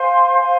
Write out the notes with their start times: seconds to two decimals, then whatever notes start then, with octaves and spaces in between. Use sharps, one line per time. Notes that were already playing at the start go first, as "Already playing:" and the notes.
Already playing: C5 F5 G#5 C6
0.39 C5 F5 G#5 C6